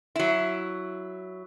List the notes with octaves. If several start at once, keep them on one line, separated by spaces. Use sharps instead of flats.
F#3 E4